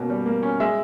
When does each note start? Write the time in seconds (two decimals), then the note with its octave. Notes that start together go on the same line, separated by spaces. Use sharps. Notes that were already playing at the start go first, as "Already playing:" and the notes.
Already playing: B2 A#3 C#4
0.10 G3
0.26 A#3
0.43 C#4
0.60 G#3 E5